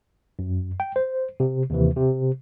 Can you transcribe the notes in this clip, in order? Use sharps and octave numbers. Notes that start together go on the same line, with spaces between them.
F#2
G5
C5
C3
D#2 C3 E3
C3